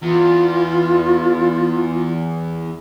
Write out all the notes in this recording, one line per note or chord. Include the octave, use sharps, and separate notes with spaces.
E2 F4